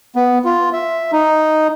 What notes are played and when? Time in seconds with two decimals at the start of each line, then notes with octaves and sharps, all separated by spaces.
0.16 B3
0.45 F4
0.73 E5
1.12 D#4